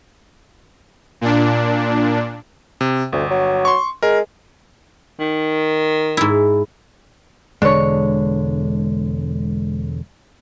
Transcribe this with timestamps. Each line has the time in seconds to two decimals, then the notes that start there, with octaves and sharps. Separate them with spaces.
1.21 A#2 D4
2.81 C3
3.12 G1 D2
3.30 F#3
3.65 C6 C#6
4.03 G#3 A#4
5.20 D#3
6.17 G#2 E4
7.62 E1 D3 G#3 D4 C#5